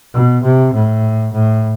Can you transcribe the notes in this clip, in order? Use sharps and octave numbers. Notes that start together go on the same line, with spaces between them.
B2
C3
A2
A2